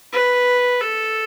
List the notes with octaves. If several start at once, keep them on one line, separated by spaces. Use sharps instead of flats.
B4
A4